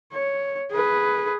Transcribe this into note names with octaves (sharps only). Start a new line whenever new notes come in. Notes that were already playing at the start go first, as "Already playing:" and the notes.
C#5
G#4 B4